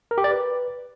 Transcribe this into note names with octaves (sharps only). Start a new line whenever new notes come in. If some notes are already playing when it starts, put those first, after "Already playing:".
A#4
G4
D5
B4